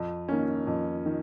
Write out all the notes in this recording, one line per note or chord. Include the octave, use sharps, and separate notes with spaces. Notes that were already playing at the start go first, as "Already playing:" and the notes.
Already playing: F2
D#3 A#3 C#4
F2
D#3